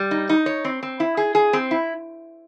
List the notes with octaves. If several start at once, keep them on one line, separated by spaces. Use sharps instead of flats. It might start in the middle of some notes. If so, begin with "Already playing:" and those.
Already playing: G3
D#4
D#4
C#5
C4
C4
E4
G#4
G#4
C4
E4